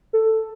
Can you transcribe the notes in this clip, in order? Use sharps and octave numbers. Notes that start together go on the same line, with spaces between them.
A4